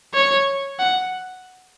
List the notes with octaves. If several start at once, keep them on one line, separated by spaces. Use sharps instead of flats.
C#5
F#5